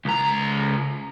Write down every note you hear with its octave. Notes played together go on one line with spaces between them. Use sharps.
C#2 A#5